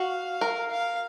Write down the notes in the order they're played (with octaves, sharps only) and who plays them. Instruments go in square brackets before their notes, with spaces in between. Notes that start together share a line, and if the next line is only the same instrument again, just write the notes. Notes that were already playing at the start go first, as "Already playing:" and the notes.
Already playing: [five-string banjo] F#4 [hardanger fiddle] F5
[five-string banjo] A#4
[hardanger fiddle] F5